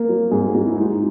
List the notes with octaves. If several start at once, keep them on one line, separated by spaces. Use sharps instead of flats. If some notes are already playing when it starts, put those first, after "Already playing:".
Already playing: A#3 A#4
F#3
G#2 G#4
F#4
G#2 F#4
E4
G#3 D#4